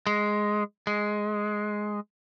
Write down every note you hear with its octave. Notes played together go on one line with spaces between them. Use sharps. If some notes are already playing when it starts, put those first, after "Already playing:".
G#3
G#3